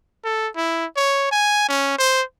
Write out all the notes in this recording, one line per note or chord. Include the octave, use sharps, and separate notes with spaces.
A4
E4
C#5
G#5
C#4
C5